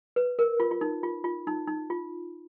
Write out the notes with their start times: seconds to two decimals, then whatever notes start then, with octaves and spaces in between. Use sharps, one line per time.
0.16 B4
0.39 A#4
0.60 F4
0.71 F4
0.81 D#4
1.03 F4
1.24 F4
1.47 D#4
1.67 D#4
1.90 F4